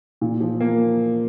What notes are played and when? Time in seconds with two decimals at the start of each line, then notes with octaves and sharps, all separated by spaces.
0.21 A#2
0.40 F3
0.60 A#3